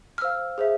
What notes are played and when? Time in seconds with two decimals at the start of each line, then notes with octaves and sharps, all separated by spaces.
0.18 F6
0.21 C5 F5 E6
0.58 G#4 C5 E5